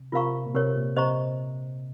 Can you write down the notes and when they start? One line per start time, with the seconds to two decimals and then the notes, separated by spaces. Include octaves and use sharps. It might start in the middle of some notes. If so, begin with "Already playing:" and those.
Already playing: C3
0.12 C3 F4 A#4 F5 A#5 C#6
0.46 A#2
0.55 C3 G4 A#4 C#5
0.76 A#2
0.96 C3 C5 D#5 A#5 C#6